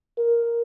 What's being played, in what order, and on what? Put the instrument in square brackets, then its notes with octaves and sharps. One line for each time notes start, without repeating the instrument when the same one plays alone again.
[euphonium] A#4